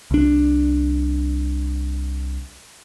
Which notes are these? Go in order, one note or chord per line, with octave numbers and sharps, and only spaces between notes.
C2 D4